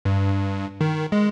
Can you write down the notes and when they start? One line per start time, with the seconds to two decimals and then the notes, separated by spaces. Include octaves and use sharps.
0.05 G2
0.81 D#3
1.12 G#3